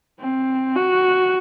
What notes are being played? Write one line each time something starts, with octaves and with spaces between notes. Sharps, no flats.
C4
F#4